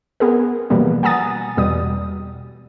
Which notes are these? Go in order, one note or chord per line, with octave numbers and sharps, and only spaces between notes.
B3 G#4 A#4
B2 E3 F3 G3 A#3 B3
F#5 G#5 A#5 D#6 A6
E2 B2 G3 D#6